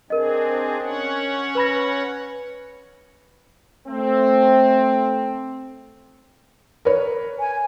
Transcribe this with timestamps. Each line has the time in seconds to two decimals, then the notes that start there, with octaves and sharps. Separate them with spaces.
0.10 C4 D4 G#4 A#4 D#5
0.82 C#4 C#5 F#5
1.55 B4 B5 A#6
3.88 A3 C4
6.85 A#4 B4 C#5
7.40 G#5